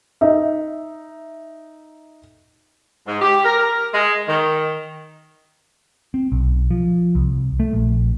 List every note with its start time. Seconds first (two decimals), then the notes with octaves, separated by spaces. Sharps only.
0.21 D#4 E5
3.07 G#2
3.21 G4
3.45 A#4
3.59 A#4
3.93 G#3
4.28 D#3
6.14 C4
6.32 B1
6.71 F3
7.15 C2
7.60 A3
7.73 A#1